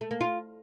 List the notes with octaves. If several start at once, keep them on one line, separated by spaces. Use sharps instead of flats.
A3
A#3
F4